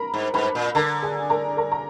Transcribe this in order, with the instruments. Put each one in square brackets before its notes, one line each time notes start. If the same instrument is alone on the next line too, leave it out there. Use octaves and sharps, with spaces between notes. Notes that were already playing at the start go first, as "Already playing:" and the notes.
Already playing: [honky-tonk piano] A#4 A#5 B5
[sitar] G#2
[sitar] G#2 [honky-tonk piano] B4 B5
[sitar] A#2
[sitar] D3 [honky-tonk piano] A#4 A#5
[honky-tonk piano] G#4 G#5
A#4 A#5
A#4 A#5
A#5